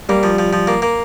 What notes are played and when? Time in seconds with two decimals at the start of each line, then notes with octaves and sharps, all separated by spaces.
0.09 G3 A#3
0.23 F3
0.38 F3
0.53 F3
0.67 A#3
0.82 A#3